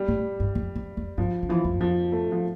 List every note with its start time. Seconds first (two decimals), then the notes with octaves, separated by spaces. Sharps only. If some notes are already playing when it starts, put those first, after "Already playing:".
Already playing: G3
0.08 A2
0.40 G2
0.55 F2
0.76 F2
0.97 F2
1.17 G2 F3
1.43 D3
1.49 E3 F3
1.64 F2
1.74 G2
1.81 F2 F3
2.12 A3
2.32 F3